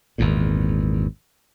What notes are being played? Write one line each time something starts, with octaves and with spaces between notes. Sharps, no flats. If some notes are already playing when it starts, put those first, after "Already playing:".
G#1 E2 A#2